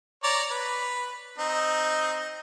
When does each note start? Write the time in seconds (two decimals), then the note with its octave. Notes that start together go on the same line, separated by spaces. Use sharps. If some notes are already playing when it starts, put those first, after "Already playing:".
0.23 C#5 D5 A#5
0.51 B4
1.38 C4 D#4